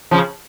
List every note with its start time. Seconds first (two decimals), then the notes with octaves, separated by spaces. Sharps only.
0.11 C#3 F3